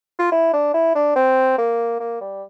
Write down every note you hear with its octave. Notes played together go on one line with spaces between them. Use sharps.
F4
E4
D4
E4
D4
C4
A#3
A#3
G3